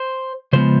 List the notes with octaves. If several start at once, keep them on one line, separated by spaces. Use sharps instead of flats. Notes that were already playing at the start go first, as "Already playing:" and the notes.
Already playing: C5
C#3 F3 G#3 B3 C5